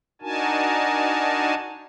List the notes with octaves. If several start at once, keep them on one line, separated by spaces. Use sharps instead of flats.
D4 D#4 F#4 A#4 G#5 A5